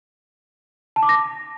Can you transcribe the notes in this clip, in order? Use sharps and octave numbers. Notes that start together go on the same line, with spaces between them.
A5
D6
A#6